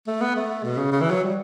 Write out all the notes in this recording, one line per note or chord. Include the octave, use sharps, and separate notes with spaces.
A3
B3
A3
B2
C#3
C#3
E3
F#3
G3